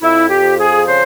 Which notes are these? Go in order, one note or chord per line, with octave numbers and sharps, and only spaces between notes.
F2 E4
G4
F3
G#4
C#3 C5